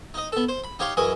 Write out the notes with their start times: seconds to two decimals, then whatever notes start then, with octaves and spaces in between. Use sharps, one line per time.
0.14 D#4 D#5
0.32 B3 A4
0.49 C5
0.64 B5
0.79 D#4 G4 C#5 F5 C6
0.97 F#2 E3 G#4 D#5 G#5